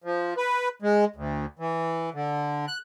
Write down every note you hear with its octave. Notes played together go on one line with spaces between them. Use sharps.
F3
B4
G#3
D2
E3
D3
F#6